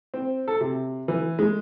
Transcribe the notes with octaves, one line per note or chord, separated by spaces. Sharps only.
C4
A4
C3
E3
G#3